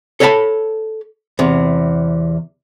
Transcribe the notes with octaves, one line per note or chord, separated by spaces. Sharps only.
A4 C#5 D#5 F5 A5 B5
E2 C3